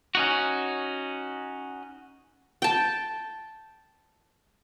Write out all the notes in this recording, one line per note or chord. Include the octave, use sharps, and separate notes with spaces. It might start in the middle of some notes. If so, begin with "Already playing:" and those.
C#4 D#4 F#4
G5 A5